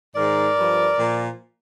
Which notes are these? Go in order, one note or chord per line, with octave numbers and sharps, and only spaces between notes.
G#2 D#3 A#4 D5
G2 F3
A#2 F3